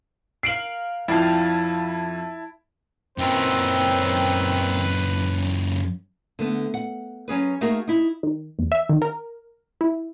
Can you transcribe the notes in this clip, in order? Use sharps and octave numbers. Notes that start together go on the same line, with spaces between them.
A#4 F5 C7 D7 F#7
F2 F3 E4 D5 F5 G5 A5
F#2 A#2 D#3 C4 B4
D3 A3 B3
F#5
F#3 C#4 G#4 B4
A3 A#3 D#4 F#4 G#4 A#4
D#4 E4
D#3
E2
E5
D#3
A#4
E4